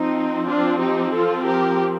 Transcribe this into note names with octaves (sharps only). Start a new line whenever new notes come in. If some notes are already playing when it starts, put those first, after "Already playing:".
Already playing: F3 C4 D#4
D4 F4
D#4 G4
F4 A4
G4 A#4